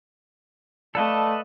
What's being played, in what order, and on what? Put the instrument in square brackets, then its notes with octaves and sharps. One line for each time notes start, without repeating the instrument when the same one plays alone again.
[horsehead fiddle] A3 A5 [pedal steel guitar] A4 B4 D#5 [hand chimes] D5 F5 D6